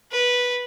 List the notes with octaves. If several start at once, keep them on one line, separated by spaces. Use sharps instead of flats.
B4